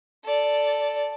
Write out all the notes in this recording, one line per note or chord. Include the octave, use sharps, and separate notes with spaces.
A4 D5